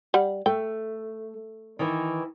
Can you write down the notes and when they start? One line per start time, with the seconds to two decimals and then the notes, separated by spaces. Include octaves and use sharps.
0.14 G3 F#5
0.46 A3 G5
1.79 D#3 E3